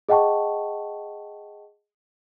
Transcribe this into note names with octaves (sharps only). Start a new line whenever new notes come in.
G#4 D#5 F#5 G5 A5 C#6